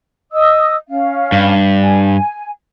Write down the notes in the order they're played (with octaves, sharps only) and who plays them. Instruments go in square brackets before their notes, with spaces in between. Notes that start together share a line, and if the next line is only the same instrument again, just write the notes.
[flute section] D#5 D#6 E6
C#4 F5
[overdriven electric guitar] G2
[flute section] G#5